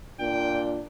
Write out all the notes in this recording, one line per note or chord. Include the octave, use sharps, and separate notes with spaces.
A#2 D4 G5